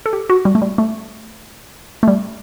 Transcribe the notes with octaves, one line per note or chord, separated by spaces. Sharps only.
A4
G4
F#4
G3
A3
G3
A3
A3
G3